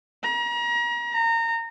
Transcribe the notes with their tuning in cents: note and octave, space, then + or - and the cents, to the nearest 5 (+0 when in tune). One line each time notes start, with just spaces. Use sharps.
A#5 +35
A#5 -25